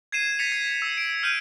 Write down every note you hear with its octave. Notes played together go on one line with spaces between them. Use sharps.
G#6 C7 D#7 E7
A6 B6 C#7 F7
G#6
E6
D7
F6 G6 D#7